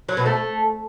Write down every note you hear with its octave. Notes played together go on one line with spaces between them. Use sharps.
F#3
B2
A3